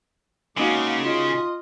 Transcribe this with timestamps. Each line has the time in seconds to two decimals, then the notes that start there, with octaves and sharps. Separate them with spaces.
0.57 C#3 G#3 A#3 D#4 F#4 F5 D6
1.05 F4 D#5